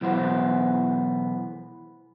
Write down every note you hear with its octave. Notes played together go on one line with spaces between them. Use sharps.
B1 E3 B3 C5